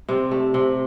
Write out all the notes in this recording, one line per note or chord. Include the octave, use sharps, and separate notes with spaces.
C3 C4
A3
C3